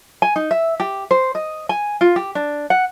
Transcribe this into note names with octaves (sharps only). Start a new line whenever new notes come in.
G#5
D#4
E5
G4
C5
D#5
G#5
F4
G4
D4
F#5